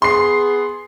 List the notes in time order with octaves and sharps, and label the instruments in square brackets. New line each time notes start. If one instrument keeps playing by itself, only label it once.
[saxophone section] B3 G#4 [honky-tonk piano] C6 C7